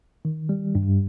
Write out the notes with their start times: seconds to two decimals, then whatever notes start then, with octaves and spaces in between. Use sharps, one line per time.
0.25 D#3
0.49 G3
0.75 G2